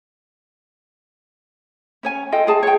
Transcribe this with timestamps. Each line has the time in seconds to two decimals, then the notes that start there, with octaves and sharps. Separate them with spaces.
2.03 C#4 C#5 G#5
2.32 F4 A4 D#5 G5
2.47 F4 G#4 A5
2.63 C#5 G5